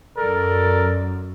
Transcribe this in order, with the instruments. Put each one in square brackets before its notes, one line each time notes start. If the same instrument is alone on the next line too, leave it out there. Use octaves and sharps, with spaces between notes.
[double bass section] F#2 [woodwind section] A4 D5 [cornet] A#4